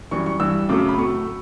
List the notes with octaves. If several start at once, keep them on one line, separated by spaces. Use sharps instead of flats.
F#2 E3 G3 C#6
C#6
G2 E3 G3 E6
F#2 C#3 F#3 A3 D6
B5
A2 F#3 A3 C#6